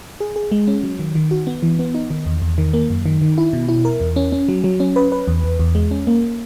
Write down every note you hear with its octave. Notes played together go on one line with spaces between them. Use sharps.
G#4
G#4
G#3
C#4
F#3
D#3
D#3
F#4
B3
E3
B3
D#4
D#3
E2
E2
D#3
A#3
F#2
D#3
D#3
E4
B2
E4
A#4
E2
C#4
C#4
F#3
F#3
C#4
B4
B4
E2
E2
E2
G#3
C#4
A#3